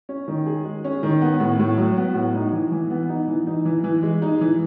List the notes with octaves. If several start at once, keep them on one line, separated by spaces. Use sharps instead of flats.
C#4
D#3
G#4
G#3
C#4
D#3
B3
A2
A2
F#3
B3
A2
D#4
E3
E3
B3
D#4
E3
D#4
E3
E3
G#3
D#4
E3